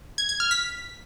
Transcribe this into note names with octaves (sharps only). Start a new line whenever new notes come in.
G#6
G#6
F6
B6